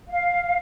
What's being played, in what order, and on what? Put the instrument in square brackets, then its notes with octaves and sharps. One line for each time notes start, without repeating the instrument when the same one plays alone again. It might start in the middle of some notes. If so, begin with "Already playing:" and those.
[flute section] F5